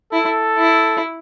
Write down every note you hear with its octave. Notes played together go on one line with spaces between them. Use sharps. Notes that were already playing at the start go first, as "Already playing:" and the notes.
E4 A4
E4